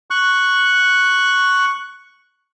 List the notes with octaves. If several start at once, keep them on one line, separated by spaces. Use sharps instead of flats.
C#6 F#6